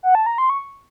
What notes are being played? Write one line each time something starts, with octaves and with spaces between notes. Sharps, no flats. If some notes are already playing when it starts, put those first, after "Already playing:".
F#5
A5
A#5
C6
C#6